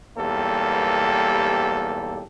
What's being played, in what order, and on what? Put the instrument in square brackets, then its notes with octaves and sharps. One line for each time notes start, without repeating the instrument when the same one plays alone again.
[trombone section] B1 E2 G3 A#3 G4 A4